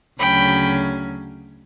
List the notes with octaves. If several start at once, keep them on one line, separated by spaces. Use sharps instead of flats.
D2 C#3 F#3 C#4 G5 B5